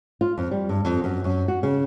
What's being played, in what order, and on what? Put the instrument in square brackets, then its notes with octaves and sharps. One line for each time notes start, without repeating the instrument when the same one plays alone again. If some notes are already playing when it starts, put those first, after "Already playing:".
[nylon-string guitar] F4
F2
G3
G2
F2
F#2
F#2
F#4
C#3